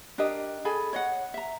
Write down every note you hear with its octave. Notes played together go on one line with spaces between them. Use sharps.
D4 G4 A#4 D#5
G#4 A4 G#5 B5
C#5 D#5 F#5
E5 A#5